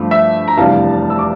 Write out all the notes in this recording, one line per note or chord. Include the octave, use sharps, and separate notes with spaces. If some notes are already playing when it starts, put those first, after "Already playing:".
Already playing: G2 F3 A3
E5
A#5
F1 E2 C3 G3 D4 F5 A5
E6
D6